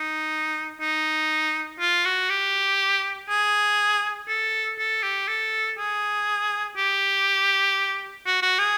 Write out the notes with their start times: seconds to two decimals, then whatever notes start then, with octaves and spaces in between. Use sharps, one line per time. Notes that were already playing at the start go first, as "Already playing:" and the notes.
Already playing: D#4
0.81 D#4
1.80 F4
2.05 F#4
2.30 G4
3.29 G#4
4.28 A4
4.79 A4
5.03 G4
5.28 A4
5.78 G#4
6.77 G4
8.26 F#4
8.42 F#4
8.59 G#4